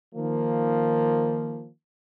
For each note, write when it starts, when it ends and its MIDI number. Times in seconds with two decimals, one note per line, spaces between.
0.15 1.69 51
0.15 1.69 53
0.15 1.69 58